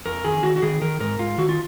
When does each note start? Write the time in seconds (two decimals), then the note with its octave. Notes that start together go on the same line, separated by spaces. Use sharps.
0.05 F2 A#4
0.24 D#3 G#4
0.43 D#3 F#4
0.56 F#4
0.62 D#3 G#4
0.81 D#3 A#4
1.00 G#2 A#4
1.19 G#2 F4
1.38 D#3 F#4
1.49 F4